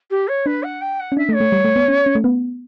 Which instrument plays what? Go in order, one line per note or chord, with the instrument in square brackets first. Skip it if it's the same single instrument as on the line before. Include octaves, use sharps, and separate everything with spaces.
[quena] G4
C#5
[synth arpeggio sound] D4 [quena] B4
[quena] F#5
G5
F#5
[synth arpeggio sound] C#4
[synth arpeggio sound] D4 [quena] E5
[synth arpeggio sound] A3
[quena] C#5
[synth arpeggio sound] A3
G3
A3
B3
C#4
C#4
A3
B3